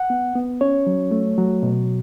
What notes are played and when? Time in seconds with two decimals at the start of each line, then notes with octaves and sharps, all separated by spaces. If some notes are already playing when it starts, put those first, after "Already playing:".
Already playing: F#5
0.10 B3
0.35 B3
0.61 C#4 C#5
0.87 F#3
1.11 A3
1.38 F#3
1.63 B2